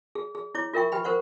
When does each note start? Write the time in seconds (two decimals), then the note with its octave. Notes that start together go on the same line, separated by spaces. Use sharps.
0.15 G#4
0.35 G#4
0.55 E4 C#5 D6
0.73 F4 A#4 E5 G5 C#6
0.92 G4 B4 G5 B5
1.04 A#4 C5 F#5 C#6